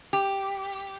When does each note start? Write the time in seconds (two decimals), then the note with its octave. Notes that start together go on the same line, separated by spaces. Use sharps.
0.13 G4